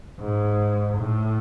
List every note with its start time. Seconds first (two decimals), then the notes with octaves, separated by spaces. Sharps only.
0.20 G#2
0.97 A2